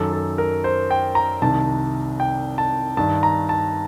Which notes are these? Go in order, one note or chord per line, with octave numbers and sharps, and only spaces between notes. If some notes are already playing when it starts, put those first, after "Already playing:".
Already playing: F#2 D#3 A4
A4
A#4
C5
G5
A#5
C2 C3 D#3 A5
G5
A5
G2 D#3 A5
A#5
A5